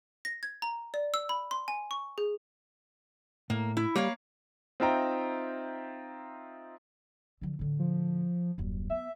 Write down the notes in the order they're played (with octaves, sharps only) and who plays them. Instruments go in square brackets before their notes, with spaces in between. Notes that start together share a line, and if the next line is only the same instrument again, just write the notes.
[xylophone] A#6
G#6
A#5
D5
E6
B5
C6
G#5
C#6
G#4
[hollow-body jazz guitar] A2 [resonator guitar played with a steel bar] A#3
[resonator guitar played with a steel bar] E4
[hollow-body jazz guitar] G3 [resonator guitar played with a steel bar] A#3 C#5 F5
[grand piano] C4 D#4 F4 E5 G5 A#5
[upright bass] D3 F3
A2 D3
[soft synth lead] F3
[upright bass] D#1 F#2
[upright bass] B3 [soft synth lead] E5